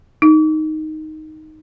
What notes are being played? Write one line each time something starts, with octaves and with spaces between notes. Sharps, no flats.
D#4